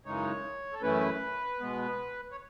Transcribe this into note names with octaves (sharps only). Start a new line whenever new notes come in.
F#2 C#3 E3 G#3 D#4 C#5
A4
F#2 E3 A3 C#4 E4 B4
B2 G#3 B3
C#5